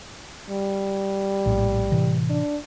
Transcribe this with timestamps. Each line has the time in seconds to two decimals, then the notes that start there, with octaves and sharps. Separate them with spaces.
0.50 G3
1.46 A#1 A2
1.92 A2 C3 E3
2.30 D4